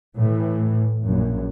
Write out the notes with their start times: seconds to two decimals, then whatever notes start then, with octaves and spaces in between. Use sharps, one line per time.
0.18 A2 E3
1.05 A#1 F#2